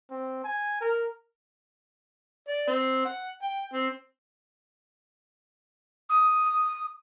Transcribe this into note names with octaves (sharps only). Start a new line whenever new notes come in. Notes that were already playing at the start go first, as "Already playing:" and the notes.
C4
G#5
A#4
D5
C4
F#5
G5
C4
D#6